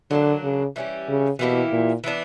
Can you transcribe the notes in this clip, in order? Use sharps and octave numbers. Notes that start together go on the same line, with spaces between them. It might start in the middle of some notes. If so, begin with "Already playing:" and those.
D3 F#3 A#3 D4
C#3
E3 G3 C#4 G4
C#3
B2 E3 A#3 E4 G4
A#2
E3 B3 D4